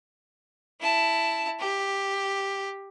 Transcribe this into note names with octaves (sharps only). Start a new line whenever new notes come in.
E4 A5
G4